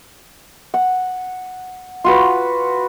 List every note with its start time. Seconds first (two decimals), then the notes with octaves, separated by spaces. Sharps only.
0.74 F#5
2.04 F4 F#4 B4